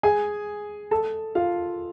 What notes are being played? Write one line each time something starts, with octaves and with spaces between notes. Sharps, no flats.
G#4 G#5
A4 A5
F4 F5